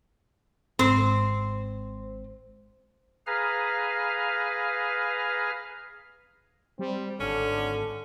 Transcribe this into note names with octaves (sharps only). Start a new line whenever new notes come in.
G#1 C4 C5
G#4 B4 F5 A#5 F6
G3 C4
G#1 D3 C#4